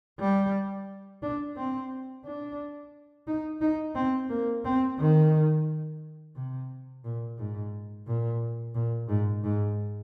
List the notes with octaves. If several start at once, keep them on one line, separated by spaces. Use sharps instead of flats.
G3
D4
C4
D4
D#4
D#4
C4
A#3
C4
D#3
C3
A#2
G#2
A#2
A#2
G#2
G#2